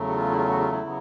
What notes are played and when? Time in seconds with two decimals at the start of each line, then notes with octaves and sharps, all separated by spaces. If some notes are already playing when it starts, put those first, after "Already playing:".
Already playing: E2 C#3 F#3 A3
0.10 F#4
0.14 F4
0.31 E4
0.38 F4
0.48 F#4
0.60 F4
0.72 E4
0.84 C#3 F#3 B3